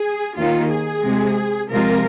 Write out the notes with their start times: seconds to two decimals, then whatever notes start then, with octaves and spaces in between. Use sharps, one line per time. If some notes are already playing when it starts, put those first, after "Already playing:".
Already playing: G#4
0.38 D#2 D#3 A#3 D#4 F4
0.71 G#4
1.04 C3 G#3 C4
1.71 C3 F3 G#3 C4 F4 A#4